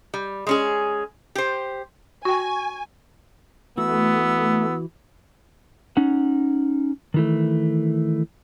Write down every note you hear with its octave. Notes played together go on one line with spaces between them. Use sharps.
G3
G#3 C#4 G#4
G4 C5
F#4 G5 G#5 C#6
E3 A3 B3 F#4 E6
C#4 D#4 F#5
D#3 E3 A3